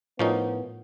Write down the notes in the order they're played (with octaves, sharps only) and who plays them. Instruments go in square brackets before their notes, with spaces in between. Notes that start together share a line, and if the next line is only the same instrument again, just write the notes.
[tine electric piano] A2 [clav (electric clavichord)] F3 C#4 D#4 [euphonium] B3 [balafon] F4 A#4